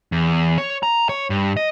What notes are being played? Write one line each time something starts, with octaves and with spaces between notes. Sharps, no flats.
E2
C#5
A#5
C#5
G2
D#5